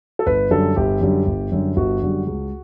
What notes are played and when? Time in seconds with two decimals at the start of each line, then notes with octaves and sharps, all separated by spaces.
0.19 A4
0.26 G1 B4
0.50 F#2 D3 G3 A4
0.76 G1 G4
1.01 F#2 D3 G3
1.26 G1
1.52 F#2 D3 G3
1.76 G1 F#4
2.01 F#2 D3 G3
2.26 C#2